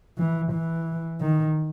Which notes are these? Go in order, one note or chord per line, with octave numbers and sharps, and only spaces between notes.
E3
E3
D#3